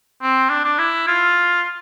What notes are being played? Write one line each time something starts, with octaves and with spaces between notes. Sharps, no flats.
C4
D4
D4
E4
F4